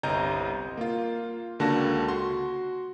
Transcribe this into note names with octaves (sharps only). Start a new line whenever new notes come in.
G1 C2 D#5 A#5 G6
A#3 F4
C#2 D3 A#3 F#4 A5 A#6
F#4 C6